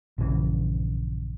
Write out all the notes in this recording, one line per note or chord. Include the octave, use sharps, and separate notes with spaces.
A#1 G2 C#3 E3